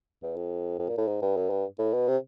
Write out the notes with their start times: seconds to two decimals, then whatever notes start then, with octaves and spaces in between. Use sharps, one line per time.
0.23 E2
0.36 F2
0.79 F2
0.89 A#2
0.98 A2
1.07 G#2
1.22 G2
1.37 F#2
1.50 G2
1.79 A2
1.94 B2
2.08 C3